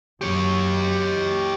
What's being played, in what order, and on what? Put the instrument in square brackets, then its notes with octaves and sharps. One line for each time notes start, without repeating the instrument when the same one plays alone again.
[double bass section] F#2 [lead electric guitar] G4 C#5